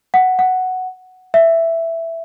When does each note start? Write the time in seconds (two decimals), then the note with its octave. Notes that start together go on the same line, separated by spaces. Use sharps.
0.14 F#5
0.39 F#5
1.34 E5